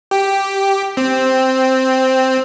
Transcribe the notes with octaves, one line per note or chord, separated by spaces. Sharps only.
G4
C4